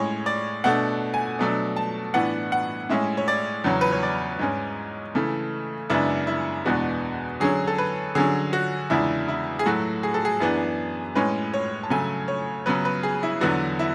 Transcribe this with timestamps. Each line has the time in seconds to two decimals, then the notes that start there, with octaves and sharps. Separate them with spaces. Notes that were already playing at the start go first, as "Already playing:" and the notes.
Already playing: A2 G#3 C#4 C#5
0.26 D5
0.64 B2 A3 D4 F#5
1.14 G#5
1.39 B2 F#3 A3 D4
1.76 A5
2.14 A2 E3 B3 D4 F#5
2.52 F#5
2.89 A2 G#3 C#4 E5
3.17 C#5
3.28 D5
3.64 E2 C#3 F#3 C#4
3.81 B4
3.92 C#5
4.03 D5
4.39 G#2 G#3 C#4
5.15 C#3 E3 A3
5.90 F#2 C#3 G#3 B3 D4 E4
6.27 E4
6.65 E2 B2 G#3 B3 D4 F#4
7.40 D3 F#3 C#4 G#4
7.67 A4
7.78 B4
8.15 D3 F#3 C#4 G#4
8.53 F#4
8.90 E2 C#3 G#3 D4 E4
9.28 E4
9.59 G#4
9.66 A2 F#3 A3 F#4
10.03 G#4
10.14 A4
10.25 G#4
10.40 F#2 E3 B3 D4
11.15 A2 G#3 C#4 B4
11.54 C#5
11.83 A5
11.90 C#3 F#3 A3 G#5
12.28 C#5
12.66 C#3 F#3 B3 B4
12.85 B4
13.03 G#4
13.23 E4
13.41 E2 D3 F#3 B3 D4 F#4
13.79 E4